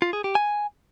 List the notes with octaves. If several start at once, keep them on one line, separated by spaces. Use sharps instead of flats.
F4
G#4
G4
G#5